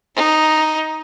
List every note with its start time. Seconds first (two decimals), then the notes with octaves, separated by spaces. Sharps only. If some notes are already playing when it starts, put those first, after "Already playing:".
0.15 D#4